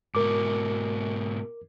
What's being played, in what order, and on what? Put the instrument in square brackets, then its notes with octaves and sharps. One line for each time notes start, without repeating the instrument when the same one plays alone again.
[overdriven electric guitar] G#2 B2 [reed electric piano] A#4 D6